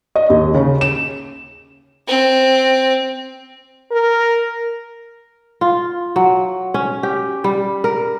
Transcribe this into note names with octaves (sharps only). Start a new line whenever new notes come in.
D#5
D#2
C#3
E7
C4
A#4
F4
F#3
C#4
G4
G3
A#4